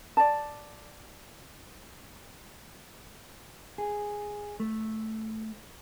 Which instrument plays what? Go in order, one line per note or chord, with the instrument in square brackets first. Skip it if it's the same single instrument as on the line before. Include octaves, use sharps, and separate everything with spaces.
[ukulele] D5 A5
[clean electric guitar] G#4
A3